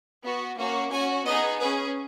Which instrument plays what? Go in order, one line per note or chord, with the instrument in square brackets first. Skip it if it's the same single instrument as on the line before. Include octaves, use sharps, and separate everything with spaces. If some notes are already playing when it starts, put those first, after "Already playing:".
[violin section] B3 F#4
A#3 C#4 F#4
C#4 F#4 G#5
B3 D#4 G#4 D#5
C#4 G#4 B4